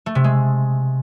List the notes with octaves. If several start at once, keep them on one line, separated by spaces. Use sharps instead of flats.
A3
C3
G#3